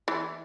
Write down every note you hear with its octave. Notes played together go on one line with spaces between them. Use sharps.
E3